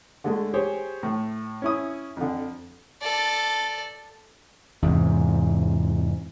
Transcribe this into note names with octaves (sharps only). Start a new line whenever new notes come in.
D3 G#3 A3
G4 G#4 C5 C#5
A2
C#4 E4 D#6
F2 D3
A4 D5
E2 G#2 C3